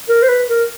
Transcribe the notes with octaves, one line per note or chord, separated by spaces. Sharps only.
A#4
C5
B4
A#4